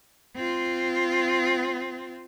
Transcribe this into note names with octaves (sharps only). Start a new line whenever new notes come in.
C4 F4